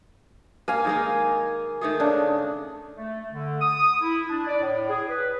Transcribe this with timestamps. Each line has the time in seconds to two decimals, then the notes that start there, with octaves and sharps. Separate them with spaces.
0.68 A#3 F5 G#5
0.85 D#3 G#3 A#3
1.81 D#3 A3 G#4
2.00 C#3 D4
2.97 A3
3.32 D3
3.61 D#6
4.01 E4
4.29 D4
4.47 D5
4.61 A2
4.89 G#4
5.09 B4